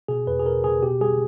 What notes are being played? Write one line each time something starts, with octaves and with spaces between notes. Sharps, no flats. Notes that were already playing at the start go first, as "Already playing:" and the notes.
B2 G#4
E2 B4
G#4
B2 A#4
B2 G#4
B2 G4
G3 G#4